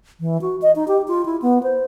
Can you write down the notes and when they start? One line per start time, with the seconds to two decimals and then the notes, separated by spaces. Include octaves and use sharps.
0.20 E3
0.41 F#4
0.62 D#5
0.76 D#4
0.88 G4
1.08 F4
1.25 E4
1.42 B3
1.63 C5